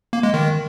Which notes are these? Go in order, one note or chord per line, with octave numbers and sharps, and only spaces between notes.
A#3
G#3
D#3